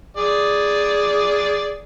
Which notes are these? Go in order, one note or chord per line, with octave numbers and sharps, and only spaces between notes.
G#4 D5